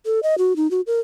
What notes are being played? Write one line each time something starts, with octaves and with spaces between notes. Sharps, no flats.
A4
D#5
F#4
D#4
F#4
A#4